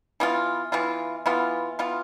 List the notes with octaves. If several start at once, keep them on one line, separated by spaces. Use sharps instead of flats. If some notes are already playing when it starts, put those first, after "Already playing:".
E3 B3 F4
E3 B3 F4
E3 B3 F4
E3 B3 F4